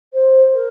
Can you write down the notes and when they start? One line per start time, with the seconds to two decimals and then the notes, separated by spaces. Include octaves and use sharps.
0.13 C5
0.53 A#4